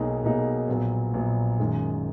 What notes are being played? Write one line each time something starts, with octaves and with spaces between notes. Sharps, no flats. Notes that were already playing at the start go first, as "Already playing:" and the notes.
Already playing: B1 B2 A#3 D#4 G#4
B1 B2 A#3 D#4 G#4
A#1 A#2 F#3 B3
A#1 A#2 F#3 B3
F#2 D#3 G#3